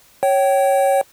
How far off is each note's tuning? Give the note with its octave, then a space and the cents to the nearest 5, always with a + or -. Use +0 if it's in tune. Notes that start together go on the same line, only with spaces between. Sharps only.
C#5 -5 G5 -25